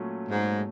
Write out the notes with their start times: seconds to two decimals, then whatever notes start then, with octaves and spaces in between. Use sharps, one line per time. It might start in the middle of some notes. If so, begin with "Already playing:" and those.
Already playing: A#2 F#3 A3 C#4
0.29 G#2